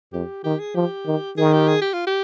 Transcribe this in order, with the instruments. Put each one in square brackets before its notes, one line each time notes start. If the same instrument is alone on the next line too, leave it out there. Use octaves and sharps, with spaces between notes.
[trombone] F2 [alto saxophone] G4
[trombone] D#3 [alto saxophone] G4
[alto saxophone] G#4
[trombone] F3 [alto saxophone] G4
[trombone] D#3
[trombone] D#3 [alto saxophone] G#4
[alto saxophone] G4
G#4
G4
F4
G4